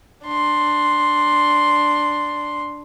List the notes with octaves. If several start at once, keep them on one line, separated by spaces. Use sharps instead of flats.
D4 C6